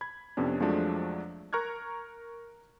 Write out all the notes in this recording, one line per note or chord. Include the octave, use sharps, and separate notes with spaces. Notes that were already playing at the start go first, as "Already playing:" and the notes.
B5 G#6
F2 C3 B3 C#4 D4
F2 F3 F#3 G#3 A3 D4
A#4 A#5 C#6 F6 F#6 G#6